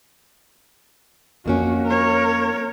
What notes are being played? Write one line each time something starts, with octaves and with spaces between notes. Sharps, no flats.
F2 A#3 C#4 F#4
A#4 C#5